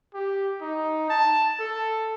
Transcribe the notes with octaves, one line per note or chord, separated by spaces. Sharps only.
G4
D#4
A5
A4